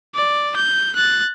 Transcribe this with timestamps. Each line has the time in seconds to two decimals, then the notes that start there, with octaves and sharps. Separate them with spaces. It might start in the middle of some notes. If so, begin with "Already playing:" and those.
0.15 D5
0.56 G6
0.96 F#6 A6